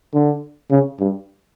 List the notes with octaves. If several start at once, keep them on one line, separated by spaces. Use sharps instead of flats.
D3
C#3
G2